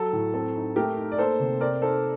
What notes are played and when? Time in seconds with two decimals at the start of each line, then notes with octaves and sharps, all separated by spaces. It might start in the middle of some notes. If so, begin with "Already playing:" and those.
Already playing: F#3 A4
0.13 A2
0.34 C4 A4
0.55 D#4
0.76 A3 G4 A#4
0.97 D#4
1.12 D5
1.18 A#3 A4 C5
1.40 C3
1.60 C4 A#4 D5
1.82 D#4 A4 C5